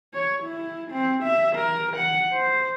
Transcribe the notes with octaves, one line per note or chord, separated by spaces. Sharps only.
C#5
E4
C4
E5
A#4
F#5
C5